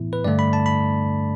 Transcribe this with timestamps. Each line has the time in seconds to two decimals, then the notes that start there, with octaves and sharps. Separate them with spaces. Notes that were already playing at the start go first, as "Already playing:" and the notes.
Already playing: A2 E3 B3 E4
0.13 B4
0.24 G2 D3 A3 D5
0.39 B5
0.53 A5
0.66 B5